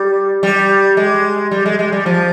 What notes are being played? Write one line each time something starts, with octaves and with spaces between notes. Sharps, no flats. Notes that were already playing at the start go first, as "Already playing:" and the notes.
Already playing: G3
G3
G#3
G3
G#3
G#3
G3
F3